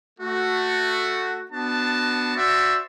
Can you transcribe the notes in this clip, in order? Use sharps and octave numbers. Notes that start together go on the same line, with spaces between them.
A3 F#4
B3 D4 F#4 A5
F#4 C5 D5 E5